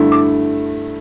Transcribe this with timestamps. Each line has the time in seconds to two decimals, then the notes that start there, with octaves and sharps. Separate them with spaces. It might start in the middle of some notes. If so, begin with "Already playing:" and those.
Already playing: G2 D3 A3 E4
0.12 D6